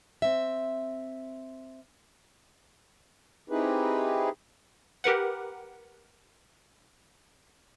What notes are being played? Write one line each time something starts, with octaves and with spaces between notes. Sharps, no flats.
C4 E5
C4 D#4 E4 G4 G#4 B4
G4 A#4 B4 F#5